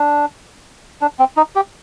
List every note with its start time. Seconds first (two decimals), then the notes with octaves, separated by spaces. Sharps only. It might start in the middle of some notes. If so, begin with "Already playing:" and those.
Already playing: D4
1.01 D4
1.19 C4
1.37 D#4
1.55 G4